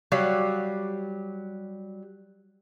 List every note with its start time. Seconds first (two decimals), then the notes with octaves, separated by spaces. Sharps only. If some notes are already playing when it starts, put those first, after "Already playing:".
0.12 F#3 G3 G4 F5